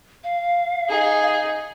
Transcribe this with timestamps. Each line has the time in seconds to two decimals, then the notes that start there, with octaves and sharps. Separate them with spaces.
0.24 F5
0.88 D#4 G#4